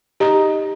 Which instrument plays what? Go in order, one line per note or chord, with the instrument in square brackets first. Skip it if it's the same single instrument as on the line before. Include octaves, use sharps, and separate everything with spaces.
[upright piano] D#4 [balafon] G4